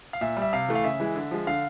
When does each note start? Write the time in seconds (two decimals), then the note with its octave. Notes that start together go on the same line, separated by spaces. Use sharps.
0.13 F5
0.21 A#2 E5
0.37 G3
0.42 E5
0.53 C3 F5
0.69 E3 A3
0.75 F5
0.84 C#3 E5
1.00 E3 G#3
1.16 D3
1.31 F3 G#3
1.47 D3 F5